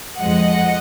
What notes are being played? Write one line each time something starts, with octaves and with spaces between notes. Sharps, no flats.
F2 F3 G#3 D#5 F#5